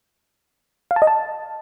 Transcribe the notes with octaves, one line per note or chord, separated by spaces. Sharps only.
F5
A5
D#5
A5